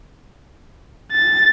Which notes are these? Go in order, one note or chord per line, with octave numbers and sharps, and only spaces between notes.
A6